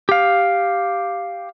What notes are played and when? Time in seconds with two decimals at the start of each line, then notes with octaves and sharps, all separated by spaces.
0.09 G4 F5